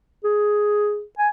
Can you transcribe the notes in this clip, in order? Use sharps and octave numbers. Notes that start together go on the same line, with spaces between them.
G#4
G#5